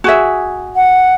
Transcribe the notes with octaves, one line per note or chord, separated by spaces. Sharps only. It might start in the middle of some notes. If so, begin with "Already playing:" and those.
F#4 G#4 E5
F#5